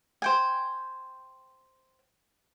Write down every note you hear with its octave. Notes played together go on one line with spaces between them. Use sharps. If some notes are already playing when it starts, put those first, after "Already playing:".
C5 G5 G#5